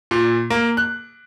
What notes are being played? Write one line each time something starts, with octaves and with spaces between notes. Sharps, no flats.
A#2
A#3
F#6